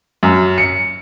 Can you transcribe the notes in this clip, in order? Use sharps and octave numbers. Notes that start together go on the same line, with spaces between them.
F#2
C#7